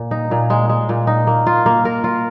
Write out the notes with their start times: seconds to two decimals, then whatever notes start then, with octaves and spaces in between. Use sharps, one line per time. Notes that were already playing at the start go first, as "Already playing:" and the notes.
Already playing: A#2
0.11 D#4
0.31 A#2
0.50 G#3
0.69 G#3
0.89 A#2
1.07 D#4
1.27 A#3
1.47 F4
1.66 A#3
1.85 A#4
2.04 F4